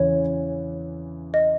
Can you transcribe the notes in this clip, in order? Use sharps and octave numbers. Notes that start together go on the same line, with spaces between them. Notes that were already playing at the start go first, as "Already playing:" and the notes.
Already playing: E2 C#3 E3 C#5
D#5